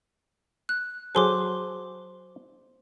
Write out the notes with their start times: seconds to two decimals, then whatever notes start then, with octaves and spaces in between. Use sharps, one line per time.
0.69 F#6
1.15 F#3 G#4 A4 C5 C6 D6